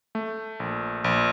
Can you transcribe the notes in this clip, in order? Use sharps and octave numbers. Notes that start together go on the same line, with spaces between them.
A3
A#1
A#1